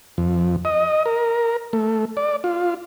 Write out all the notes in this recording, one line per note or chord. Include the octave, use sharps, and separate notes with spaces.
F2
D#5
A#4
A3
D5
F4